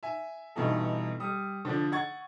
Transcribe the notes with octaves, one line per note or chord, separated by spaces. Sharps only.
E5 G#5
G2 B2 E3 D#4 A4
G3 D#6
D3 F3 D4
F#5 C#6 G#6 A6